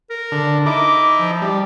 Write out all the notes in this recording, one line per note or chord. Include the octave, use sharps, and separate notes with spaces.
A#4
D3
D#4 E4 D6
F3
G3